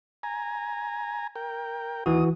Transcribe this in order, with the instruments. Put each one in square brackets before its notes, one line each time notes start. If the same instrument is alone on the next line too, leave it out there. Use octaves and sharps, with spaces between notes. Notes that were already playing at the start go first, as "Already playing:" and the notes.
[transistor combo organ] G#5 A#5
A#4 G5
[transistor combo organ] D#2 D#6 [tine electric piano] E3 F#4